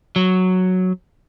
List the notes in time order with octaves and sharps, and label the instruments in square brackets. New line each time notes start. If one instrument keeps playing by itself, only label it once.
[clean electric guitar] F#3